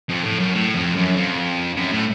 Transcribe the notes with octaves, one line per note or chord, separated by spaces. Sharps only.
F2
A2
F#2
A2
F2
F#2
F2
F#2
A2